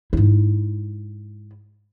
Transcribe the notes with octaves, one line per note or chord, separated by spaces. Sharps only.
G#2 E4